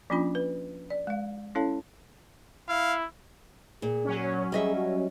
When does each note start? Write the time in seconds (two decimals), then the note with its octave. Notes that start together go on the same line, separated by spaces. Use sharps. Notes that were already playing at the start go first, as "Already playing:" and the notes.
0.10 F3 A#3 C#4 D4 F4 B5
0.35 B4
0.90 D5
1.07 G#3 F5
1.55 C#4 E4 A4 C#5 F5 A5
2.69 E4 F5
3.82 A#2 G#4
4.05 F#3 C#4
4.21 C#5
4.52 G3 G#4 D#5 E5
4.75 F#4